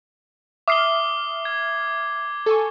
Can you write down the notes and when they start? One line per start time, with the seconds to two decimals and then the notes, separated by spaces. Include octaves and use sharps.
0.68 E5 D6 D#6 F6 C7 G7
1.45 G#6
2.46 A4 G#5 C#6